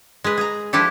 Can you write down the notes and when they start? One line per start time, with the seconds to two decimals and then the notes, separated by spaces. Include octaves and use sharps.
0.24 G#3 B4
0.38 G#4 A#5
0.73 F3 D4 E4 G4 A4